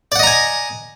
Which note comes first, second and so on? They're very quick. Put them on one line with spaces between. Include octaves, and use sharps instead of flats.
D5 F#5 D#5 A#5 G#5